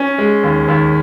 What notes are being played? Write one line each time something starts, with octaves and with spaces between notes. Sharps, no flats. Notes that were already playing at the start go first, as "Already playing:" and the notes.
Already playing: C#4
G#3
D#2
D#2